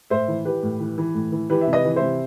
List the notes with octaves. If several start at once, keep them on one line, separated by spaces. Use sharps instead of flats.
A2 C5 E5
E3
E3 G4 B4
A2
E3
E3
A2
E3
E3 G4 B4
E5
C3
B4 D#5
E3
C5 E5
C3